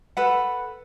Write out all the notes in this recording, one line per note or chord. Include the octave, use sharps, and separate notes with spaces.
A4 B4 F#5